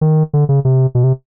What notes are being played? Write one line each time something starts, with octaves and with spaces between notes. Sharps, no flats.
D#3
D3
C#3
C3
B2
C3